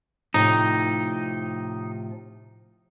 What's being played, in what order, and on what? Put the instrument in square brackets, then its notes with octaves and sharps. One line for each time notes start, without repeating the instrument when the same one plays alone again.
[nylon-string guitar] A2 C3 F3 [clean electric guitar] D#4